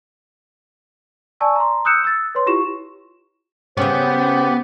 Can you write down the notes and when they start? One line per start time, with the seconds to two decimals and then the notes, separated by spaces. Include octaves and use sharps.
1.41 D5 G#5 A5 C#6 E6
1.56 A#5 C6
1.85 D#6 E6 F#6 G6 C#7 E7
2.04 E6 A6
2.35 B4 C#5 C6
2.46 E4 F4 G4 C#6 E7
3.77 C#3 B3 C#4 G4 C5